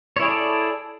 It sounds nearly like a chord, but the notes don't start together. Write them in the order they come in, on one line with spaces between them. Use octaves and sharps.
C#5 E4 G#4 D5 A4